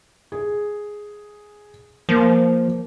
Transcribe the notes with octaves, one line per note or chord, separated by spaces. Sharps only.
G#4
F3 A#3